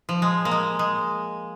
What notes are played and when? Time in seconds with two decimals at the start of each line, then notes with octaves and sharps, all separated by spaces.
0.09 F3
0.22 G#3
0.45 A#3
0.51 G#3
0.79 G#3